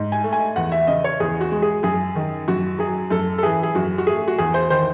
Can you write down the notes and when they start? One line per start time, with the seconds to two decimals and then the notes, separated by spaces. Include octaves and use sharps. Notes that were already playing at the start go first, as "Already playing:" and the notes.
Already playing: G#2
0.12 G#5
0.24 A3
0.33 G#5
0.56 E2 F#5
0.72 E5
0.87 C#3 D#5
1.04 C#5
1.20 E2 G#4
1.41 F#4
1.52 G#3
1.62 G#4
1.83 F#2 G#4
2.15 D#3
2.48 F#2 F#4
2.79 F#3 G#4
3.10 F#2 A4
3.38 A4
3.43 E3 G#4
3.63 G#4
3.75 F#2 F#4
3.98 F#4
4.07 A3 G#4
4.28 F#4
4.39 E2 G#4
4.54 C5
4.70 D#3 C5